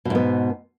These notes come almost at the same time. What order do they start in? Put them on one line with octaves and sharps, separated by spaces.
B2 G#2 B3